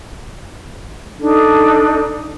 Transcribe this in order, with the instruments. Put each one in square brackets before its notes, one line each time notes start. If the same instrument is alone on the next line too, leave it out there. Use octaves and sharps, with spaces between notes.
[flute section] D4 D#4 A4